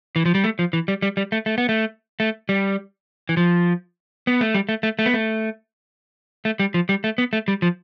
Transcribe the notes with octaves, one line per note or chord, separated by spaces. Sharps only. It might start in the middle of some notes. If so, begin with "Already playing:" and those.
E3
F3
G3
A3
F3
E3
G3
G3
G3
A3
A3
B3
A3
A3
G3
E3
F3
B3
A3
G3
A3
A3
A3
B3
A3
A3
G3
F3
G3
A3
B3
A3
G3
F3